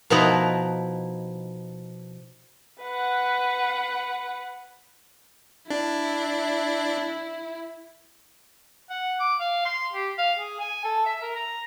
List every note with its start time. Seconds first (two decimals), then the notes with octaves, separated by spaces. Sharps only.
0.10 B2 F3 D#4 E4 B4 A#5
2.82 B4 F#5
5.70 D4 E4
8.90 F#5
9.20 D6
9.40 F5
9.65 C6
9.93 G4
10.18 F5
10.36 G#4
10.60 G#5
10.84 A4
11.06 E5
11.22 A#4
11.36 A#5